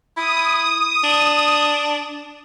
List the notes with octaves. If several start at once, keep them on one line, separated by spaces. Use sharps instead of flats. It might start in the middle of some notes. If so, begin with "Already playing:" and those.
E4 D#6
D4